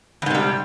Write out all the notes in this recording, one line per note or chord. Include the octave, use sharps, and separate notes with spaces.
E2 G#2 C3 G3